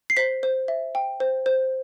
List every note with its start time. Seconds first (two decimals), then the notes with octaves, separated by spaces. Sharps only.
0.10 C7
0.17 C5 B6
0.43 C5
0.68 E5
0.95 G5
1.20 C5
1.46 C5